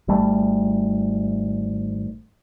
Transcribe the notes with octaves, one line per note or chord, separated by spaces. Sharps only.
G#1 G3 A3